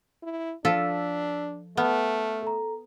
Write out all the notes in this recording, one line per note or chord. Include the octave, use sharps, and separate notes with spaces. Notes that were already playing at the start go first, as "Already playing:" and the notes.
E4
F3 D4 F4 A4 E6 B6
A3 B3 A5 F6 F#6
A4 A#5